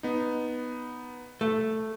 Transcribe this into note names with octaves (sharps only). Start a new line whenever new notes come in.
B3 D#4
A3